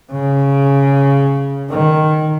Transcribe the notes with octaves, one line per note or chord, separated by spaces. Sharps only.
C#3
D#3